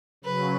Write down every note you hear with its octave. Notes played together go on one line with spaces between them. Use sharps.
C#3 F#3 B4